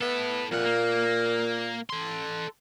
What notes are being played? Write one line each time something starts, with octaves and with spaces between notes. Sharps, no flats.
B3 E4 A4
F2 A#2 F#5
A#3
A4 C6